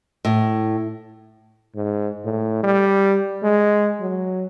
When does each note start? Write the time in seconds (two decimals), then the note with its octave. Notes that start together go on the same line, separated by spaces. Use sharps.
0.25 A2
1.75 G#2
2.25 A2
2.63 G3
3.43 G#3
4.01 F#3